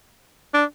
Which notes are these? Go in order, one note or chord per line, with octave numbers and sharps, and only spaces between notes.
D4